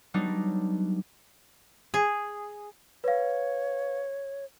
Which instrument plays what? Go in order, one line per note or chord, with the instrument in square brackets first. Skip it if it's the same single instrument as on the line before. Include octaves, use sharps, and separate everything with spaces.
[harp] F#3 G3 B3 D4 D#4
[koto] G#4
[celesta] B4 F5 [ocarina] C#5